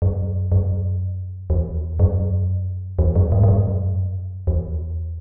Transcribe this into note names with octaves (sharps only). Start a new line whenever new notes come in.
F#2
F#2
E2
F#2
E2
F#2
G#2
G#2
F#2
E2